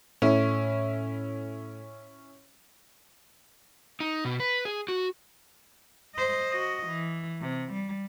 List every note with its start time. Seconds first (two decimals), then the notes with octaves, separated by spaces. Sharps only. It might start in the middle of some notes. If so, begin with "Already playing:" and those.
0.22 A2 C#4 E4
4.00 D#4
4.25 B2
4.40 B4
4.65 G#4
4.88 F#4
6.15 C5 D#5
6.51 F#4 D#5
6.87 E3
7.41 C3
7.73 G3